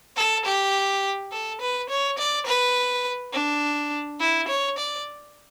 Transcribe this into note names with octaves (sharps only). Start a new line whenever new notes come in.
A4
G4
A4
B4
C#5
D5
B4
D4
E4
C#5
D5